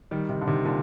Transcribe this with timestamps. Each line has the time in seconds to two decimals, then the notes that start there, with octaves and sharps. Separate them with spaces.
0.11 D#3 G3
0.29 C3 D#3
0.41 D3
0.47 C3 D#3
0.64 A#2 D3